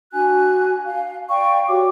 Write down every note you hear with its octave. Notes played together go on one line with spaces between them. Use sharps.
D4 F#4 G#5 F#6
F5
D5 F5 G5 C#6
F#4 G4 C#5 D6